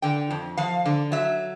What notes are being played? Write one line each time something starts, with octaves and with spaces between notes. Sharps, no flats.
D3 G5
F2
F3 F5
D3
F#3 E5